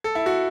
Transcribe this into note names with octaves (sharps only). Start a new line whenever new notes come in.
A4
E4
F#4